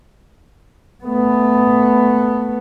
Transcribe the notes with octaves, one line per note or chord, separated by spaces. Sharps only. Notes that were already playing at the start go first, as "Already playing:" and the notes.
A3 B3